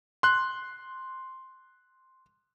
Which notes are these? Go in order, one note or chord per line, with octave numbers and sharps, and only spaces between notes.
C6 F#6